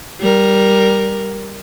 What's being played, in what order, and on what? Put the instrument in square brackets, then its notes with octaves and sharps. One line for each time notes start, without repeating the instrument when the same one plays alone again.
[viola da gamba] G3 A#4